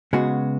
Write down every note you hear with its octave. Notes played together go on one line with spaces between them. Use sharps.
C#3 G#3 B3 F#4